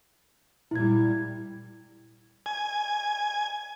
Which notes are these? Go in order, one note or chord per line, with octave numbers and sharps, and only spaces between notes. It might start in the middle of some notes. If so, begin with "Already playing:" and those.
A#2 G3 E4 G#6
G#5